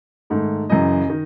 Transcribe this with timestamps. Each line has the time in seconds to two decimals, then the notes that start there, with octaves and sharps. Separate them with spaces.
0.30 G#2 D#3 A3
0.69 F#2 C#3 E3 D#5
1.10 D#3